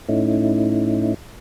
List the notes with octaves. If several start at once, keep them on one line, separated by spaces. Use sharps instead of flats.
A2 A3 C#4 D#4 E4